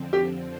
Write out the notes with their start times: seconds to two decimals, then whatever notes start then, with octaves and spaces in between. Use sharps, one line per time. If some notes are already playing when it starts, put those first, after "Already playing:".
Already playing: F2 D3 F3 C4
0.13 G4